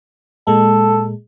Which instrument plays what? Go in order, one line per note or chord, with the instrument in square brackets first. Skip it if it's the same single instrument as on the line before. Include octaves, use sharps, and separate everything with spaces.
[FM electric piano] A#2 G#3 [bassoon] A4